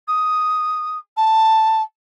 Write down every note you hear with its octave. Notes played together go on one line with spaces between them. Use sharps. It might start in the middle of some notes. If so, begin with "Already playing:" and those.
D#6
A5